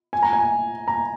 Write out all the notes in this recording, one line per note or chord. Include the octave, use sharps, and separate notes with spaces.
G#5
A#5
G#5
A#5